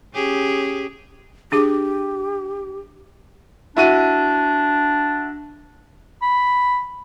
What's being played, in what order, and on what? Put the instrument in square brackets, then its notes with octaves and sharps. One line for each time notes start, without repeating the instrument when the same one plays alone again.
[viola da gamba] C#4 G4 G#4
[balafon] D4 G#4 D6 [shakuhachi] G4
[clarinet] D4 [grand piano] E4 F#4 D#7
[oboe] B5